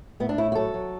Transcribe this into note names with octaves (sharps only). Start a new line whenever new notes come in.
A2 B3
D4
A2 E4
F#4
F#3 A4
F#3